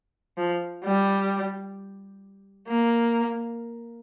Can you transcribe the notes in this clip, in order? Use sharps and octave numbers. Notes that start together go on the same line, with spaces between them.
F3
G3
A#3